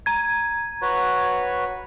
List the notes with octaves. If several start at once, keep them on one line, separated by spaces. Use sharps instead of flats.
A#5 G#6
F#4 B4 C#5